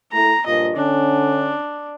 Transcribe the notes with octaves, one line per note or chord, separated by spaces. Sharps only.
A3 E4 A#5
G2 A#2 F3 D#5
D3 C#4 D4